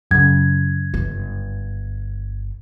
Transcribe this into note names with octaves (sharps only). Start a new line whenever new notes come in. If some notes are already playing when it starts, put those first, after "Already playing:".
F#2 C#3 G#6
G1